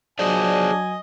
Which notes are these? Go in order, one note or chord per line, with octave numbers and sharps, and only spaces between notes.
F#3 D4 G#4 C5 D5 D#5 G#5